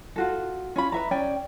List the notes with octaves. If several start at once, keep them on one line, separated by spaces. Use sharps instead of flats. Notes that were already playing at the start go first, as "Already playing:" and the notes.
F4 F#4 A4
C#4 F4 B5
B4 E5 A#5
C#4 D5 G5